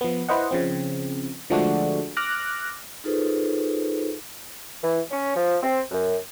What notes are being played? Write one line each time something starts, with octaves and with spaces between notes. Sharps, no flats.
F3 B3
E4 B4 C5 D#5 F#5
C#3 F3 C4
D3 F3 G#3 A3 D4 F#4
D6 F6 F#6 A#6
D#4 F4 G#4 A4 B4 C5
E3
C#4
F3
C4
F#2